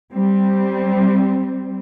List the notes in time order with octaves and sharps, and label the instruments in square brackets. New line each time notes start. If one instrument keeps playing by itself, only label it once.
[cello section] G3 C4